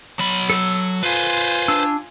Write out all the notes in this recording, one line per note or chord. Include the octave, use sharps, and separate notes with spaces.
F#3 B5
A4 E6
F4 B4 C5 G#5
D4 E6